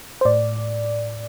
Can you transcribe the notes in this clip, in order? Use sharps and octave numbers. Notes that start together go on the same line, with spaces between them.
C5
A2 D5